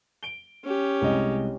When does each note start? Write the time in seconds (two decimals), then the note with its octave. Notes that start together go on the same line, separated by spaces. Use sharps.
0.23 D7 G7
0.64 C#4 G4
1.01 C2 G#3 D#5